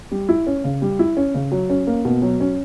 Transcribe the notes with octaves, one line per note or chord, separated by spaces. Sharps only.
G3
E4
C#4
C#3
G3
E4
C#4
C#3
F#3
C#4
A#3
B2
F#3
C#4